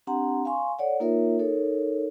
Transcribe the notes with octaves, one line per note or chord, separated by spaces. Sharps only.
C4 D4 G4 F#5 A#5 C6
F5 G#5 C6 C#6
A4 C#5 D5 F#5
A#3 D#4 F4 A#4 C#5 E5
D#4 A4 A#4 C#5